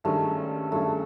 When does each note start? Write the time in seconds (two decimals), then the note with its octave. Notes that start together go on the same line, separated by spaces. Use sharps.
0.04 G2 D#3 G#3 A3 C#4
0.72 G2 D#3 G#3 A3 C#4